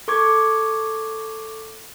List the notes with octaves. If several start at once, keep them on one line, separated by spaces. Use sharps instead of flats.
A4 C#6 D6 G#6